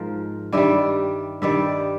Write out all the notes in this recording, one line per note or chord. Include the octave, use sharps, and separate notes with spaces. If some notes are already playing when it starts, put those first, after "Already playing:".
Already playing: G#2 F3 A#4 C5
G2 D#3 G3 D5 E5
G2 D#3 G3 D5 E5